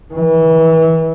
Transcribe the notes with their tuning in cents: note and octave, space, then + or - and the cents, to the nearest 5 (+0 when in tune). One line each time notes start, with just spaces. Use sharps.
E3 -30